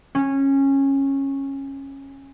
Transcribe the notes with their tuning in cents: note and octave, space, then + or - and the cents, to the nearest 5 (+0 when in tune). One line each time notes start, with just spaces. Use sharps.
C#4 -15